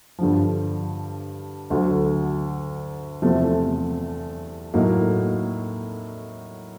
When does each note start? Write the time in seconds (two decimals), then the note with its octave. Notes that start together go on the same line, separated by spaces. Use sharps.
0.18 G2 D3 F3
1.70 D2 D3 F#3
3.22 E2 C3 F3 A3
4.74 A2 F#3 A#3 D#4